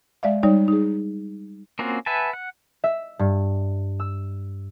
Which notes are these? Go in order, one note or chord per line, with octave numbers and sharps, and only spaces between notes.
G#3 D5 E5 F5
G3 D#4 C#5 D5
D#4 G#4
A#3 C4 C#4 F4 F#4
B4 E5 F#5 G#5 A5
F#5
E5
G2
E6